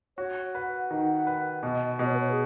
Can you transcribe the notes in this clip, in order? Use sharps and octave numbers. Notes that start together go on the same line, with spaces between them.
F#4 C#5
B4 F#5
D#3 F#5
B4
B2 D#5
B2 D#5
C#5
B4
C#5
G#4